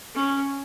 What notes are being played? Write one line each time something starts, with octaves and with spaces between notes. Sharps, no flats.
C#4